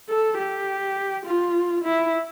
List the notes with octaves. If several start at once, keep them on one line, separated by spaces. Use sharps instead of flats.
A4
G4
F4
E4